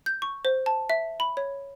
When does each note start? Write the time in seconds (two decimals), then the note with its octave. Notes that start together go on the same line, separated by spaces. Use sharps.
0.06 G6
0.22 C#6
0.45 C5
0.66 A5
0.90 E5
1.20 B5
1.37 C#5